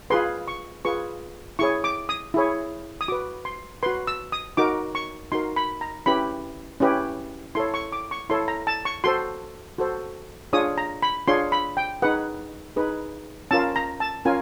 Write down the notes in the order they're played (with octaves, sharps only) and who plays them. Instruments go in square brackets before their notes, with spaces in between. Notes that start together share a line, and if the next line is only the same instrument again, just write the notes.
[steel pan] F4 G#4 B4 C6
C#6
F4 G#4 B4 C#6
E4 G#4 C#5 C#6
D6
D#6
E4 G#4 C#5
D#6
F#4 B4 D6
C6
F#4 B4 C6
E6
D#6
D#4 F#4 A#4 D6
C#6
D#4 F#4 A#4 C6
B5
A#5
C#4 E4 G4 B4 B5
C#4 E4 G4 B4
E4 A4 C#5 C6
C#6
D6
C#6
E4 A4 C#5 C6
A#5
A5
C#6
F#4 A4 C5 C6
F#4 A4 C5
D4 F4 G#4 C#5 D#6
A#5
B5
D4 F4 G#4 C#5 C6
B5
G5
D#4 G#4 B4 F#5
D#4 G#4 B4
C#4 F4 A#4 A5
A#5
A5
C#4 F4 A#4 G#5